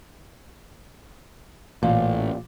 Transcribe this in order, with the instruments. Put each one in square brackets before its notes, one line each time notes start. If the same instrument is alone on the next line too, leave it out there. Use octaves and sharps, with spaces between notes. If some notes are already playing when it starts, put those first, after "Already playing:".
[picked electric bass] A1 [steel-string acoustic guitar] A#2